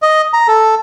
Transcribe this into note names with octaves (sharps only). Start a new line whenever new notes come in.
D#5
A#5
A4